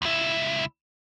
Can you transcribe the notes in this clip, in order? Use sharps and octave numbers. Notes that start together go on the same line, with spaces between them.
C#2 E4